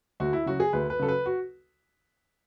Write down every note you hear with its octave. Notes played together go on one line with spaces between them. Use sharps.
D2 F#4
E4
C#3 F#3 F#4
G#4
D2 B4
B4
C#3 F#3 A4
B4
F#4